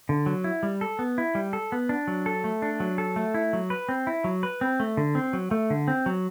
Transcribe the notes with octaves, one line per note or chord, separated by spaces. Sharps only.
D3
F#3
E4
G3
A4
B3
E4
G3
A4
B3
D4
F#3
A4
A3
D4
F#3
A4
A3
E4
F#3
B4
C4
E4
F#3
B4
C4
A3
D3
C4
F#3
A3
D3
C4
F#3